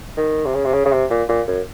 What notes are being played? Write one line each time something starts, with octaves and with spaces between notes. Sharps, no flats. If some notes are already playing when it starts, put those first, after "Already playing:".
D#3
C3
C#3
C3
C#3
C#3
C3
A#2
A#2
F#2